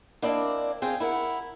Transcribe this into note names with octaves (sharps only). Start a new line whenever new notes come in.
A#3 C4 D4 E4 D5 D#5
C4 G#4 C5 F5 G5
E4 A#4 F#5